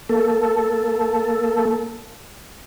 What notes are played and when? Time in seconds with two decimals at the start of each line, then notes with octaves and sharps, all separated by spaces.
0.09 A#3 A4